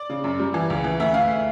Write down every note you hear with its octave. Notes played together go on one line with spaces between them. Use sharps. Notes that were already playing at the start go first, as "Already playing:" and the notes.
Already playing: D5
C#3
F#2
G3
E3
C#2
E3
D2 E5
D2 F5